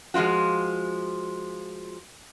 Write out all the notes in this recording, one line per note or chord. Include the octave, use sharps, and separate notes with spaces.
F3 G#3 D#4 F4 F#4